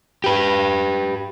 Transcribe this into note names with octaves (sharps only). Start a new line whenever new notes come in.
G4 B4